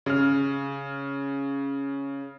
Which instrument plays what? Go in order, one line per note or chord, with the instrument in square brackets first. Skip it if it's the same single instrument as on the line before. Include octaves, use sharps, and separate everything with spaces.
[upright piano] C#3 F6